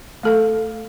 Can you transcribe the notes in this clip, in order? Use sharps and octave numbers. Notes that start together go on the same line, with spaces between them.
A3 A4 F5